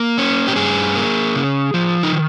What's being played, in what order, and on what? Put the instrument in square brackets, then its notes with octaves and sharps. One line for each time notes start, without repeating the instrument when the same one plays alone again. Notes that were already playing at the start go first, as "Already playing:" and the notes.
Already playing: [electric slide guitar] A#3
C#4
G4
G2 G#4
A#3
C#3
F3
D#4
D#3